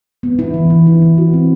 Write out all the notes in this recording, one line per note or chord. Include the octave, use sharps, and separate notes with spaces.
B3
E4
E3
E3
E4
E3
F#4
C4